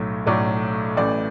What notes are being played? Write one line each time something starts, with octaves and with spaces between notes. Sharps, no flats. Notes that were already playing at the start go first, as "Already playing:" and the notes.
Already playing: B1 A2 F#3 A3
B1 A2 F#3 A3 D5
A1 A2 E3 D5